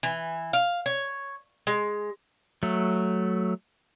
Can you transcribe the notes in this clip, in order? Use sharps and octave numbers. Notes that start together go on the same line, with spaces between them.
E3
F5
C#5
G#3
F#3 A3